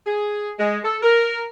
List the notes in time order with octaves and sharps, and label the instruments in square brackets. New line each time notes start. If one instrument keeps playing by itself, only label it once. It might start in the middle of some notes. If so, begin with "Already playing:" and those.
[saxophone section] G#4
G#3
A4
A#4